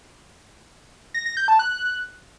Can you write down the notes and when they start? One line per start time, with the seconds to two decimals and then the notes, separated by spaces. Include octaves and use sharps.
1.14 A#6
1.26 A#6
1.37 G6
1.48 A5
1.59 F#6